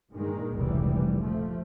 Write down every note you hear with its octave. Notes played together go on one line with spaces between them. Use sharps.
G2 A#2 D#3 G#3
F1 C#2 A#2 E3 G3
F3 A3